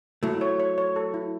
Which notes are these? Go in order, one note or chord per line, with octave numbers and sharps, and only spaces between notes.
F#3 A3 E4
C#5
C#5
C#5
A4
E4